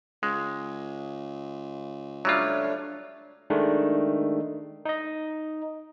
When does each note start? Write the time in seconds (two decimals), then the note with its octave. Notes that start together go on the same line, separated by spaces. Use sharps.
0.23 C#2 G#3
2.25 F#3 G3 A3 D4 F4 C#5
3.50 D#3 G#3 A3 D4
4.85 D#4 D#5